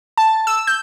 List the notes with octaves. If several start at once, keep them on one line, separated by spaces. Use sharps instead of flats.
A5
E6
G6